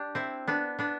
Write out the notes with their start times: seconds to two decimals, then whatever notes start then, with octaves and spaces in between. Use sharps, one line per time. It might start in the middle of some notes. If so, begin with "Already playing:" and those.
Already playing: D4 G4
0.15 C4 E4
0.48 B3 D4
0.79 B3 D4